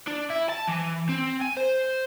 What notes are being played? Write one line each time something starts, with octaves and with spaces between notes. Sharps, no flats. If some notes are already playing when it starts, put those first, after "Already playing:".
D4
E4
A5
E3
C4
G#5
C5